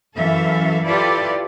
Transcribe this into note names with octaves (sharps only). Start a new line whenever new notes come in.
F#2 E3 A4 E5 F5
E4 F4 G4 A4 B4 D5